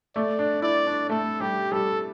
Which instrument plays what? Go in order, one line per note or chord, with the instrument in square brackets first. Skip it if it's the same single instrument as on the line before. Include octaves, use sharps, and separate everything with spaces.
[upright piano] A3 [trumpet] D5
[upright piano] D4
[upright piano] E4 [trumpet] D5
[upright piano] D4
[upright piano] A3 [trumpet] A4
[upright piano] G3 [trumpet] G4
[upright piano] G3 [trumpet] A4